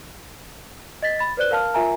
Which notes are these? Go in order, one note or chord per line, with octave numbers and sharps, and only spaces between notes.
D#5 A6 B6
B5 A6
B4 C5 D5 F#6 G7
A#4 F5 A5 F6
F4 A#4 E5 G#5 A#5